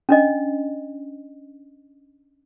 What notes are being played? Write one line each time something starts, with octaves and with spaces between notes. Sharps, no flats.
C#4 D4 D#5